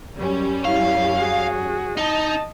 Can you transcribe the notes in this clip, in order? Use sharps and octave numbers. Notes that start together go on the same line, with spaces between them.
F#2 G3 C#4
E4 F5
F#4 G#4
D#4 D#5 A5